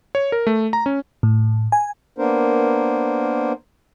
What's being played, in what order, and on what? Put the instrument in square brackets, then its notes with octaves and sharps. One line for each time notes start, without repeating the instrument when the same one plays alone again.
[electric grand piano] C#5
A#4
A3
A#5
C#4
[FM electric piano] A2
G#5
[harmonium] A#3 B3 D4 A#4 C5